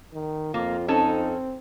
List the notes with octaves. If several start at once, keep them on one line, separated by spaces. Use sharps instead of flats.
D#3
F2 A#3 F4
C4 C#4 D#4 A4